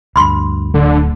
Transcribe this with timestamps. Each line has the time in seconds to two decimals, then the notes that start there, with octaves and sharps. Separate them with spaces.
0.16 D2 G2 B5 C6
0.74 D1 D3 A3